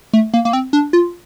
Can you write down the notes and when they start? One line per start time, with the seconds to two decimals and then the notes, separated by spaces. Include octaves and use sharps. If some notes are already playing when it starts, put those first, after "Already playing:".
0.13 A3
0.34 A#3
0.45 A#3
0.53 C4
0.73 D4
0.93 F4